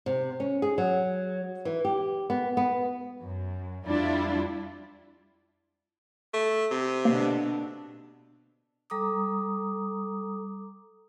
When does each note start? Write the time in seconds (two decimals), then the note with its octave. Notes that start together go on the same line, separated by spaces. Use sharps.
0.06 C3
0.40 C#4
0.62 G#4
0.78 F#3
1.65 E3
1.85 G4
2.30 B3
2.57 B3
3.22 F#2
3.86 F2 G3 D4 E4 F4
6.34 A3
6.71 C3
7.05 B2 D3 A#3 D4 C7
8.90 G3 A4 A#5 D6 D#6